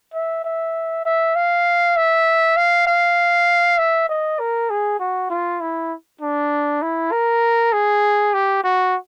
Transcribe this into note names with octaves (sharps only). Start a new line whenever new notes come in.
E5
E5
E5
F5
E5
F5
F5
E5
D#5
A#4
G#4
F#4
F4
E4
D4
E4
A#4
G#4
G4
F#4